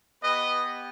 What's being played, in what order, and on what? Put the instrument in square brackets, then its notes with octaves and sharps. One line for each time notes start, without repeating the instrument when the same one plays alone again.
[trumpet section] B3 G4 B4 D#5